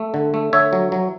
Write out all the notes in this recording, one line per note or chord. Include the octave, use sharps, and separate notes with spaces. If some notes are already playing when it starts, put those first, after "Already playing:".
Already playing: A3
D3
A3
D3 C#5 E5
F#3
F#3